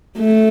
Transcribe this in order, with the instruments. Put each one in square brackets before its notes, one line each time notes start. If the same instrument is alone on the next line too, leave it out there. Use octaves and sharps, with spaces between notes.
[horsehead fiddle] A3